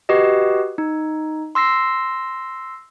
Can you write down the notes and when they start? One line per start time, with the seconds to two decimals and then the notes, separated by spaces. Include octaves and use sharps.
0.09 F#4 G4 B4 D#5
0.78 D#4
1.55 C6 E6 A#6 C7